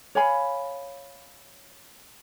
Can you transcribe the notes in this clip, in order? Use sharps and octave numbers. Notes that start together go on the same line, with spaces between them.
C#5 F5 G#5 B5